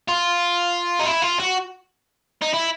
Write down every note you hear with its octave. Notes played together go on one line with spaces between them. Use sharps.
F4
D#4
E4
F4
F#4
D#4
E4